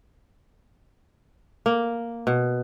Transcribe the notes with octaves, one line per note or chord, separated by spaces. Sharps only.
A#3
B2